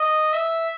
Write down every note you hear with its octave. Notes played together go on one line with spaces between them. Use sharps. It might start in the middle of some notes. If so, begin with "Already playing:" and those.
Already playing: D#5
E5